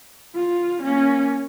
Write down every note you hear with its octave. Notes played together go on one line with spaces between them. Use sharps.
F4
A#3 C#4